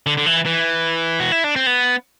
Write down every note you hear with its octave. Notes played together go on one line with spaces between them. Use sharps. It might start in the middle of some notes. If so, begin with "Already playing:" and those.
D3
D3
E3
E3
F#4
E4
D4
C4
B3